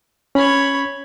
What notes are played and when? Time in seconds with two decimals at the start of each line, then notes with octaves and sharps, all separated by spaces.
0.35 C#4 C#5 B5